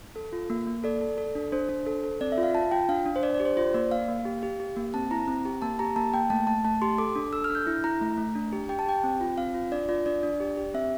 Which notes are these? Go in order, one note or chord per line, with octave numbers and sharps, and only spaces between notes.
A4
F4
A#3
A#3
A4 D5
A4
A4
D4
D4 C5
D4
A4
A4
C4 D5
E5
F4
F5
F4 A5
F4 G5
D4 F5
D4
C5
D4 D5
D5
G4
C5
F4 C5
A#3 D5
A#3 F5
A#3
G4
G4
G4
A#3
C4 A5
E4 A#5
C4
G4
A#3 A5
G4 A#5
A#3 A5
A#3 G5
A3 A5
A3 A5
A3 A5
G4 C6
A4 D6
D4
A4 E6
F6
D4
G6
E4
E4 A#5
A3
A3
D4
G4
G4 G5
A5
G4 G5
C4
F4
C4 F5
F4
D4 D5
F4 D5
D4 D5
D4
G4
G4
C4 E5